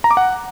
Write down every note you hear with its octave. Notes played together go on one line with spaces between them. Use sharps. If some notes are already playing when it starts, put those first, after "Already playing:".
A#5
D6
F#5